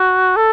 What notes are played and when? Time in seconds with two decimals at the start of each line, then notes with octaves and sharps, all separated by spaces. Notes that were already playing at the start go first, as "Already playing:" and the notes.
Already playing: F#4
0.37 A4